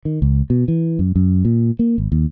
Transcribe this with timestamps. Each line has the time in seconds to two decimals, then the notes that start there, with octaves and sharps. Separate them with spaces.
0.05 D#3
0.22 C#2
0.50 B2
0.68 E3
0.99 F#2
1.16 F#2
1.45 A#2
1.79 A#3
1.98 G#1
2.12 D#2